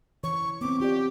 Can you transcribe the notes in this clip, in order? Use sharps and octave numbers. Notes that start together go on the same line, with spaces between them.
E3 C#5 C#6
B3 C4 D6
F4 G4 D5